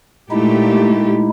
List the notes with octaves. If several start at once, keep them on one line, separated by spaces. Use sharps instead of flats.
A#2 G#3 A3 D#4 E4 G4